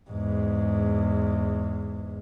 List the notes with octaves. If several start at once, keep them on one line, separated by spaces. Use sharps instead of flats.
E2 G#2